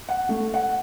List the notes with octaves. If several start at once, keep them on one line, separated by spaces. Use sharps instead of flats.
F#5
A3
F#5